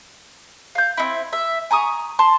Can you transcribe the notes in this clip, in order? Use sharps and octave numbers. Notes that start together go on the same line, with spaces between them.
F5 G6
C4 D#4 E4
E5
G#5 A#5 C#6 D#6
A5 C6